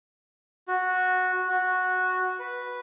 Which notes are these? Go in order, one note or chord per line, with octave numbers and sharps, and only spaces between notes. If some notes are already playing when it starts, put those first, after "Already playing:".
F#4
F#4
B4